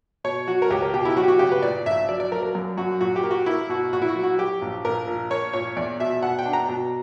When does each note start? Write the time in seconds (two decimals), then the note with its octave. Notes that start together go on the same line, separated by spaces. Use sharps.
0.24 B2 C#5
0.47 F#3 F#4
0.62 A#4
0.70 C#2 G4
0.82 A#4
0.94 B2 G4
1.05 E4
1.17 F#3 F#4
1.23 G4
1.28 F#4
1.39 C#3 G4
1.52 B4
1.62 A#2 D5
1.86 A#1 E5
2.09 F#3 D5
2.20 D5
2.31 F#3 A#4
2.43 A#4
2.55 F#2
2.77 F#2 F#4
3.01 A#2 F#4
3.16 G4
3.23 A#3
3.31 F#4
3.46 A#3 E4
3.69 B2 F#4
3.93 A#2 F#4
4.02 E4
4.09 F#4
4.16 F#3
4.23 F#4
4.39 F#3 G4
4.62 A#1
4.85 A#1 A#4
5.07 A#2
5.30 A#3 C#5
5.53 A#2 C#5
5.76 E2 D5
6.00 B2 E5
6.22 B2 F#5
6.39 G5
6.46 D4
6.53 A#5
6.69 B2